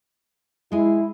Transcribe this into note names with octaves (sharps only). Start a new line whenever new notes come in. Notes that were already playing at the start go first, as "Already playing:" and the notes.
G#3 E4 G#4